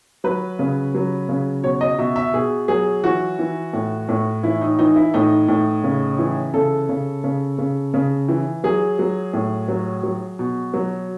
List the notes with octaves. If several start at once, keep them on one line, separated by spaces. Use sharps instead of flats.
F#3 B4
C#3
F#3
C#3
B2 C#5
D#5
B2 E5
E5
B2 G#4
F#3 G#4
E3 F#4
E3
A2
A2
E3 E4
D#4
E3 D#4
E4
A2 D#4
A2
C#3
E3
C#3 A4
C#3
C#3
C#3
C#3
E3
F#3 G#4
F#3
A2
F#3
F#3
B2
F#3